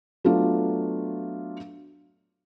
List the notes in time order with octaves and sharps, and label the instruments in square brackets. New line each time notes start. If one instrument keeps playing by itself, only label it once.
[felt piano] F#3 A3 B3 D4 F4